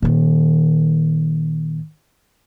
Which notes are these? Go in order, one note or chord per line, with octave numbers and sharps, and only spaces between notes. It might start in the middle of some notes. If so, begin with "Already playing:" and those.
A#2 D#3